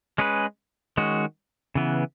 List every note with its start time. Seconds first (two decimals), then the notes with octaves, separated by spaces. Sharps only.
0.18 G#3 C#4 G#4 B4
0.97 D#3 G#3 C#4 F#4
1.75 C#3 E3 B3